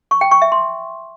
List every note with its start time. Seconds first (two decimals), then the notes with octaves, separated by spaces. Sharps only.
0.11 C#6
0.21 G5
0.31 C#6
0.42 E5
0.52 C6